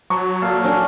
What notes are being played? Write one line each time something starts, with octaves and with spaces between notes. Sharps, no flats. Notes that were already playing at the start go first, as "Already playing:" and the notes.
F#3 A5 A#5 C#6
A#2 A4 F5
C#4 D4 A#4